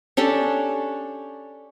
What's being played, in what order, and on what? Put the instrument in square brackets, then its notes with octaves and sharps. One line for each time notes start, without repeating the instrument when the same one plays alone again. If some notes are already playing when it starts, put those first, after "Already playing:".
[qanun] C#4 D4 G4 A4